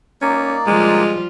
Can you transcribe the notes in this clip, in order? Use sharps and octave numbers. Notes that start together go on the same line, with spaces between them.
A#3 C#4 D#4 D5
F3 G3 G#3 F4